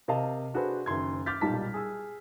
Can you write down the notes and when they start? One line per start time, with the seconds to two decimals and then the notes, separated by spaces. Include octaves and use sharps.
0.08 C3 A#4 D#5 F5 A5
0.54 D4 F#4 G#4 A4 B4 C5
0.86 F#1 D#3 C6 G#6
1.26 D6 F6 G6 A6 B6
1.41 B1 A#2 G3 D#4 A5 B6
1.74 G#4 E6